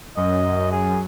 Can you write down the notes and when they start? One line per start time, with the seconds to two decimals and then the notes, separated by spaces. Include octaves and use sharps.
0.17 F#2 D#5
0.72 G#4